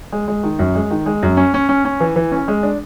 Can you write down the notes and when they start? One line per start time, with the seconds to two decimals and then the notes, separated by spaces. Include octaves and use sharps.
0.12 G#3
0.28 G#3
0.43 D#3
0.59 F#2
0.75 G#3
0.91 D#3
1.06 G#3
1.23 F#2
1.37 C#4
1.54 C#4
1.69 C#4
1.85 C#4
2.00 E3
2.16 E3
2.32 C#4
2.48 G#3
2.63 D4